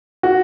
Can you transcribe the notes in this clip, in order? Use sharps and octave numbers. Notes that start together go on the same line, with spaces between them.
F#4